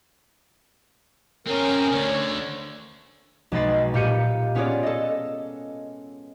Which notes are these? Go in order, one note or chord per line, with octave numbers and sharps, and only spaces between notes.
C4 C#4 G#4 A#4
D2 D3 C#5
B1 G#3 D#5 B5 A6 C7
A#2 G4 F5 G6 C#7 D#7
B3 C#4 F4 G#4 C#5 D5
A4 D#5